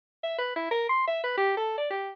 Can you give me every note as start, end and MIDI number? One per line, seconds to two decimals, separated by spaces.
0.23 0.34 76
0.38 0.53 71
0.56 0.68 64
0.71 0.84 70
0.89 1.07 84
1.07 1.23 76
1.23 1.35 71
1.37 1.55 67
1.57 1.76 69
1.78 1.89 74
1.90 2.09 67